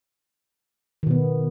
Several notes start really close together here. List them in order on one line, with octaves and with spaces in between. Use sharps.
D#3 B2 B3